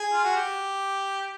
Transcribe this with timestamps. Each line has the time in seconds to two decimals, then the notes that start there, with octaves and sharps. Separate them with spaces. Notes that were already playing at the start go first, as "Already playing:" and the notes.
Already playing: G#4
0.12 F4
0.24 F#4
0.36 G4